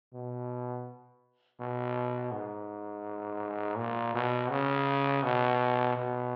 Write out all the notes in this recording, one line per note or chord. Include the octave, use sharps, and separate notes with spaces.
B2
B2
G#2
A#2
B2
C#3
B2
B2